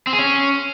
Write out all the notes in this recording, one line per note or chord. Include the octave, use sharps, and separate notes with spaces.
C4
G#4
C#4